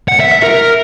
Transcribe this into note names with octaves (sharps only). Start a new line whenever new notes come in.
F#5
E5
E5
A#4